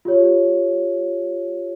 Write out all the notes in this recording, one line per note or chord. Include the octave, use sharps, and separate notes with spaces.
F4 G4 C#5